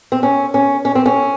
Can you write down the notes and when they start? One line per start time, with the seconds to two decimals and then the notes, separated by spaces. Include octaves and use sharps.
0.12 C4
0.23 C#4
0.54 C#4
0.85 C#4
0.95 C4
1.06 C#4